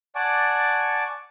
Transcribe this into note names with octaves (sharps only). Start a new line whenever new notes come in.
D5 F#5 G#5 A5 C#6 D6